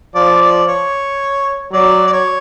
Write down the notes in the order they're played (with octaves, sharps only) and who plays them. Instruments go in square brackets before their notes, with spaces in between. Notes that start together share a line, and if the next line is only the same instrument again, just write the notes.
[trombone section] F3 [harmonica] D5
[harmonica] D5
C#5
[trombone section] F#3 [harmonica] D5
[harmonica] D5
C#5